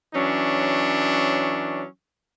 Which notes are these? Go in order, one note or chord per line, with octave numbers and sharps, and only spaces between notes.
E3 F#3 C#4 D4